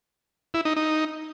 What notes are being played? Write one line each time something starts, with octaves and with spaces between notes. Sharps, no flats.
E4
D#4
D#4